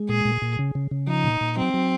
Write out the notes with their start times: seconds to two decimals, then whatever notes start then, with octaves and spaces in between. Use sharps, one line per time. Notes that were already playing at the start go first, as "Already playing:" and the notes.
Already playing: G#3
0.09 A#2 G#4
0.25 A#2
0.42 A#2
0.59 C#3
0.75 C#3
0.91 C#3
1.07 F3 D#4
1.24 A#2
1.41 A#2
1.57 F#3 C4
1.74 F#3